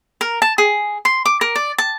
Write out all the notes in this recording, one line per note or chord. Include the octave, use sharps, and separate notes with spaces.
A#4
A5
G#4
C6
D6
A#4
D5
A5